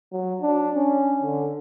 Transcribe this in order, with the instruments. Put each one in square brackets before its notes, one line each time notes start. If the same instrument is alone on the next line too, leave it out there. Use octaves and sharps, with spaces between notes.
[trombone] F#3
D4
C#4
D3